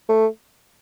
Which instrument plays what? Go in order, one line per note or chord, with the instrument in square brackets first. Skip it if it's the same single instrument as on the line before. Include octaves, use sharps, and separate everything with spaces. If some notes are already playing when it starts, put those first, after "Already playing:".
[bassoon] A3